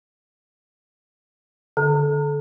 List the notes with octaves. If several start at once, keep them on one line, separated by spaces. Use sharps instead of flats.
D3